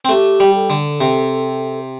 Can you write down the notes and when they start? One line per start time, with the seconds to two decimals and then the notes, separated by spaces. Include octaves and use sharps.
0.05 C4
0.09 A3 G4
0.40 G3
0.55 A4
0.70 D3
1.01 C3